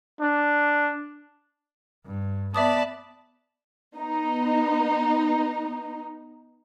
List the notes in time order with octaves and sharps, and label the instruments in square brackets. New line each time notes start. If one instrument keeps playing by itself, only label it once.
[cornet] D4
[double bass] G2
[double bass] B3 [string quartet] D5 A5 B5 [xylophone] E5 D6 D#6
[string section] B3 D#4